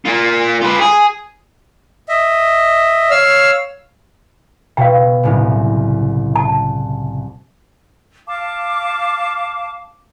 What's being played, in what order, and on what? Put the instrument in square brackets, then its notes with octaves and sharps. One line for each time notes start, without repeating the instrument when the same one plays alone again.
[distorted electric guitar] A#3 F4
F4 B4
G#4
[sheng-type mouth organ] D#5 E5
[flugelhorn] C#5 [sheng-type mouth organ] F5 E6 F6
[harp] B2 [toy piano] F5 G5
[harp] F#1 C2 A2
[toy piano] A5
[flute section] F5 A5 D6